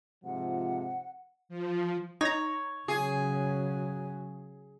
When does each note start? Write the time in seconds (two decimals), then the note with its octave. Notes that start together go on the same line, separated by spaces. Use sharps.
0.25 G#2 C3 F3 F#5
1.49 F3
2.21 D#4 C#5 A#5
2.88 C#3 F#3 G#4